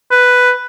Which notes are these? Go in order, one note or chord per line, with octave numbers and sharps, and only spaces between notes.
B4